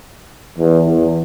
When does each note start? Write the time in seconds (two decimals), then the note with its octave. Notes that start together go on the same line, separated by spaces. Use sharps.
0.58 E2
0.86 E2